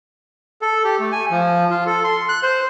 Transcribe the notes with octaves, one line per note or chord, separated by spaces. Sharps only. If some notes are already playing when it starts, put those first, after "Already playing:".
A4
G4
A3
G#5
F3
F4
A4
C6
F#6
C5